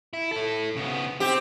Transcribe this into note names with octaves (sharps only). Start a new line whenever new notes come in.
E4
E4 A4
C#3 B3
C4 G4